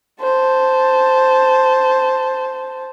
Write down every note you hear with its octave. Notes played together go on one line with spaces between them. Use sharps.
C5 A5